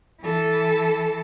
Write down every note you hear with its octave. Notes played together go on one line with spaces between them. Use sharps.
E3 A4